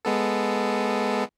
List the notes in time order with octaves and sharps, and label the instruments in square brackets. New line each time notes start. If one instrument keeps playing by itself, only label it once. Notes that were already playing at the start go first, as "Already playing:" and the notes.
[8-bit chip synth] G#3 B3 A4